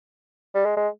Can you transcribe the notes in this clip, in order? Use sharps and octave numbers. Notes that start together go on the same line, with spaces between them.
G3
G#3
G#3